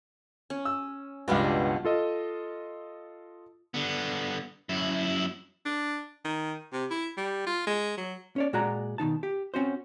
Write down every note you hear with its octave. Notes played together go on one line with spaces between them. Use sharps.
C#4
E6
C#2 G2 B2 B3 D4
F4 A4 D#5
D3 B3
F#2 E4
D4
D#3
C3
E4
G3
F4
G#3
F#3
C#4 C#5 D5
A#2 G#3 F#4 D5 A#5
B2 D#3 D#4 A5
G4
C4 C#4 F#4 C5